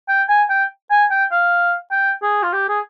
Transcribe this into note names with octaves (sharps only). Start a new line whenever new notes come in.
G5
G#5
G5
G#5
G5
F5
G5
G#4
F4
G4
G#4